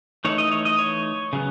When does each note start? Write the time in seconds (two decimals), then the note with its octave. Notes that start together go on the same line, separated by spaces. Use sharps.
0.24 E3 A3 D#4 C#5
0.38 D#5
0.52 C#5
0.65 D#5
0.79 C#5
1.33 C#3 F#3 B3